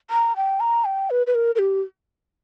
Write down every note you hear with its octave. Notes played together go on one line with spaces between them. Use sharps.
A#5
G5
A#5
G5
B4
B4
A#4
A#4
G4